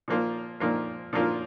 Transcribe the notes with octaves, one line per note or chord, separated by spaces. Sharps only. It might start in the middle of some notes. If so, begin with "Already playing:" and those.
A#2 F3 A#3 F4
A#2 F3 A#3 F4
A#2 F3 A#3 F4